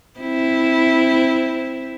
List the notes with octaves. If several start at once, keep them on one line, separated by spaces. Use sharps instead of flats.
C4 E4